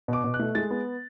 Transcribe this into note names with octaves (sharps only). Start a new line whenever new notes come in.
B2 D6
B2
F#6
A3
G#3 A6
B3